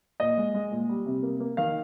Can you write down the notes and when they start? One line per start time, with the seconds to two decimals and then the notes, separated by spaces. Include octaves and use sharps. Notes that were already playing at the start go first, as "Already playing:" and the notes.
0.20 A#2 D#5
0.37 G#3
0.54 G#3
0.72 A#2
0.89 G3
1.06 C3
1.23 A#3
1.40 A#3
1.57 D#3 F5